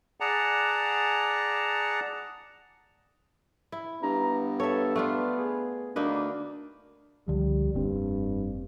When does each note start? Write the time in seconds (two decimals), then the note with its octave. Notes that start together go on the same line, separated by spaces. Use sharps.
0.20 G#4 D5 F#5 A5 A#5
3.72 E4
4.03 G2 B3 A#5
4.60 A4 C#5 E5
4.96 A3 D4 F4
5.38 G#4
5.96 D2 A#3 D4 D#4 B4
7.28 C#2 D3 F3 G3
7.75 F1 G2 A#3 C4